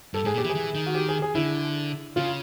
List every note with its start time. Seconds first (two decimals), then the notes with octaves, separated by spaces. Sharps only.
0.14 G2 A4
0.25 G#2 G#4
0.34 A#2
0.38 G4
0.44 E3
0.50 G#4
0.55 E3
0.75 D#3
0.86 F#4
0.95 G4
1.08 G#4
1.22 G#4
1.35 D3 E4
2.16 C#3 F4